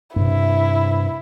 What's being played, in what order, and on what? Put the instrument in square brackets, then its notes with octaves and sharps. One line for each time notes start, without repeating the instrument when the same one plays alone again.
[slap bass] G2 C3 [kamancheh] E4